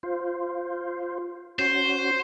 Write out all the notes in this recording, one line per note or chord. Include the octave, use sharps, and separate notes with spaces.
F4 C5
C#4 F#4 C5